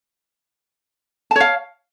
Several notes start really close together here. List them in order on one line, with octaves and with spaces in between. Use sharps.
A5 C#5 F5